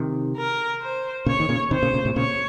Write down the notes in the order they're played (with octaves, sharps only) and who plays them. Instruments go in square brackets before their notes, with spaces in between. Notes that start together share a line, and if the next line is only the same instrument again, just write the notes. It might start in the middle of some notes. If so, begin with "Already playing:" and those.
Already playing: [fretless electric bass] C3 D#3
[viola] A#4
C5
[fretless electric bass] A#2 C#3 [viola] C#5
[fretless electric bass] D#3
A#2 C#3
[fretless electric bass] C3 D#3 [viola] C5
[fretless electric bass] A#2 C#3
A#2 C#3
A2 C3
[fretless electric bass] A#2 C#3 [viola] C#5